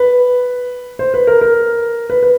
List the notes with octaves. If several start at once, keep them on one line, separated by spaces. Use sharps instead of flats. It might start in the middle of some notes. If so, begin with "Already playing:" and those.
Already playing: B4
C5
B4
A#4
A#4
B4
B4